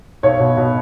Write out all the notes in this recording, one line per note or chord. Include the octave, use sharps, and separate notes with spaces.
B1 C#5
B2
B2